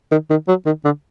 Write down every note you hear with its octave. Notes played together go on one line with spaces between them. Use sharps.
D#3
D#3
F#3
D#3
D3